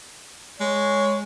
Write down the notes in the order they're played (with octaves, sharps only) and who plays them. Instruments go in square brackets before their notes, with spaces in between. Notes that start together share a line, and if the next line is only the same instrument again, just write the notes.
[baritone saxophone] G#3 [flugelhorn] C#5